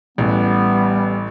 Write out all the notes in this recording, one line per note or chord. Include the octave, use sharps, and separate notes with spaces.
A1 G3 B3